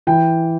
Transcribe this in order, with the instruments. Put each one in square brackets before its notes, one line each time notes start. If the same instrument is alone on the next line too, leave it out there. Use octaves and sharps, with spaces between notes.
[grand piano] E3 G5